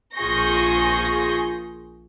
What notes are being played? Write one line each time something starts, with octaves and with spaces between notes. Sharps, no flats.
A#1 F4 G#4 C#6 G6 A#6